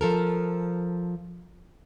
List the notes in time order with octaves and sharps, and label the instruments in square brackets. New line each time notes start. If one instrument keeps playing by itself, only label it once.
[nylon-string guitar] F3 A4 A#4